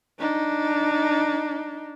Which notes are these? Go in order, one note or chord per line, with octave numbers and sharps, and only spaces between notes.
D4 D#4